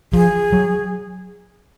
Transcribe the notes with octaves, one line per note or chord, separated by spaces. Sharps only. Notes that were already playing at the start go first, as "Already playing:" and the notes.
F3 G#4
F#3